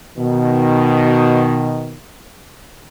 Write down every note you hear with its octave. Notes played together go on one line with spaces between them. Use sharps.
B2 D#3